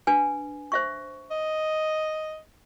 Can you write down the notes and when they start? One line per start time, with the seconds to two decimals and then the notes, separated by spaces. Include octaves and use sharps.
0.07 D4 B4 G#5
0.72 C5 E5 C#6
1.31 D#5